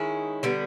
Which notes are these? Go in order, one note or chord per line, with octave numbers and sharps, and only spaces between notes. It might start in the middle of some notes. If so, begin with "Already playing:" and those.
Already playing: D#3 G#3 C#4 E4
D3 G3 B3